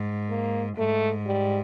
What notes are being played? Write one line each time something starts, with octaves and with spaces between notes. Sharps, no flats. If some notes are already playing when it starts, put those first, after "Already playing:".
Already playing: G#2
A#3
G#2 A3
G3